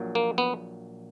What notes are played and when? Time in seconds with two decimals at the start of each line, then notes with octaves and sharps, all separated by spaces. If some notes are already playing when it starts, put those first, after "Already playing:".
Already playing: A#1 A#2 F#3
0.15 A#3
0.38 B3